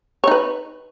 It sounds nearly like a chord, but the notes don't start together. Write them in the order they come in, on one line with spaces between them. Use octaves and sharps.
C#5 D#4 B4